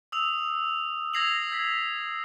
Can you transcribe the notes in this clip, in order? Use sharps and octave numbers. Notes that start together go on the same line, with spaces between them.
D#6 E6 F7
E6 G#6 A#6 C7 F7 F#7
G#6 B6